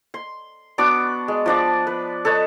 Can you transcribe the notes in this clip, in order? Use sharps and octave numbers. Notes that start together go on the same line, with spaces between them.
C6
B3 D4 F#4 D6
G#3
F3 D4 D5
B4
A4 B4 C#5 D#5